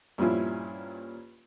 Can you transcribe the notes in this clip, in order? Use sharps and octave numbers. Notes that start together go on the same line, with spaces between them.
G2 A#2 F3 C#4 E4 F4